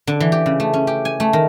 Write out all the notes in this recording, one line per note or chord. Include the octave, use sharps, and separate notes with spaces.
D3
E3
G4
C#3
A3
C#4
G4
G#5
A3
D#3